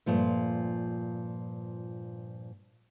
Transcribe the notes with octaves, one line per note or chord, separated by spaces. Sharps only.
G2 A#2 F3 A3